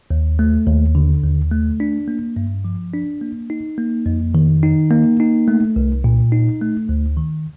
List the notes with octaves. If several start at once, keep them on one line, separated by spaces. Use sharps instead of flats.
D#2
A3
D#2
D3
D#2
A3
D4
A#3
G2
F3
D4
A#3
D#4
A#3
F2
D#3
D#4
A#3
D#4
A3
C2
A#2
D#4
A3
D2
D#3